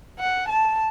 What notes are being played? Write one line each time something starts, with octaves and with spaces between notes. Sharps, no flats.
F#5
A5